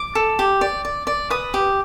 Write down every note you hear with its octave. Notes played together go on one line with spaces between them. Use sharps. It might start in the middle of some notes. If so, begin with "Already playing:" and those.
Already playing: D6
A4
G4
D5
D5
D5
B4 D#6
G4